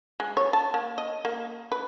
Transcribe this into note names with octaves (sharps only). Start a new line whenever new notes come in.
G#3
C#5
A5
A#3
D#5
A#3
B4